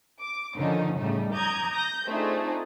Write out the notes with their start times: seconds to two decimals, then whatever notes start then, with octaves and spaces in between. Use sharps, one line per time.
0.22 D6
0.56 D3 D#3 F3 C#4 D#4
0.98 A2 C#3 G3 A3 D#4
1.33 A#5 D6 D#6 G6 G#6
1.71 G6 A#6
2.06 A3 C4 D4 D#4 F4 G#4